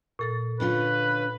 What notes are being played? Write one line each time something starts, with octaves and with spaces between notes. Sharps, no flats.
A#2 A4 A6
D3 C#4 F4 B4